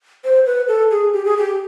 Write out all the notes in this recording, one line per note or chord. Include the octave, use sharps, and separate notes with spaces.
C5
B4
A4
G#4
G4
G#4
G4